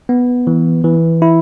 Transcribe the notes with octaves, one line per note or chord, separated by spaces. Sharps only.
B3
E3
E3
E4